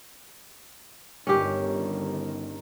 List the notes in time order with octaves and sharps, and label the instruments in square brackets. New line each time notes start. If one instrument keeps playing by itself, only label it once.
[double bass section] G1 D#3 [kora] C#4 G4